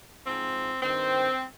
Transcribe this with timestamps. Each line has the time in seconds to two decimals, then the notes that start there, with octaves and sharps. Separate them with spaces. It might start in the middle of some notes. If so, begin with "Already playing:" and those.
0.25 G#2 F3 C4
0.82 G2 D#3 C4